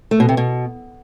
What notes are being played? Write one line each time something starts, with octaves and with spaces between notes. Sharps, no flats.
A3
B2
C3
B2